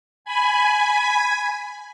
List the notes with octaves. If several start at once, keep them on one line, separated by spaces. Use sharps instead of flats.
G#5 B5